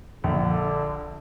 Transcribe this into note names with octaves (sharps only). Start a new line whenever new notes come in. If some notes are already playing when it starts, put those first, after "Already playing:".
A#1 D3